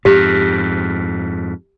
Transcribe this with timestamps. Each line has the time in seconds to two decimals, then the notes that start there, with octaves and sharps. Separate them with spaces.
0.05 F2 G#2 G4